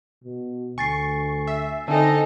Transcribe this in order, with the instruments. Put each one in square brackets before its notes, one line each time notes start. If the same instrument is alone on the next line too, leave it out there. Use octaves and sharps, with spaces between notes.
[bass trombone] B2
[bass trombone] D2 [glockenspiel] G#5 A6 C7 [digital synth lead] C#6
[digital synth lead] E5
[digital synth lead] D3 [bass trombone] C4 [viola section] D#4 A4 D#5 [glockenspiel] G#5 A5